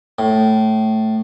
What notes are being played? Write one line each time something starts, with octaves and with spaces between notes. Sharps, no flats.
A2